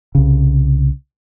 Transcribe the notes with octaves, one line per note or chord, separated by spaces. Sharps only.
C2 C#3